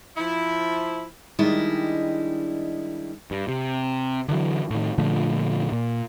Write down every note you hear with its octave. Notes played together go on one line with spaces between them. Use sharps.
F3 E4
D#3 G3 G#3 D4 E4 D#5
G2
C3
D3 E3 F#3
A2 D#3
A#2 D3 F3 A3
A#2